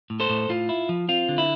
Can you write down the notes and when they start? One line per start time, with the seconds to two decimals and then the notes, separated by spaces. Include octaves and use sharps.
0.10 A2
0.20 A4 C5
0.30 A2
0.49 A2 F4
0.69 E4
0.89 F3
1.09 C4 F4
1.29 D3
1.38 E4